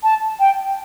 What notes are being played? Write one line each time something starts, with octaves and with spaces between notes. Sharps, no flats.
A5
G5